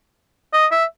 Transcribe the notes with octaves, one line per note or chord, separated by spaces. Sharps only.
D#5
E5